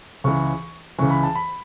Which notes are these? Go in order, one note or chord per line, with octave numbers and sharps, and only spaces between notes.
C#2 C#3 E3 C#6
C#2 C#3 E3 C#6
B5
A5
B5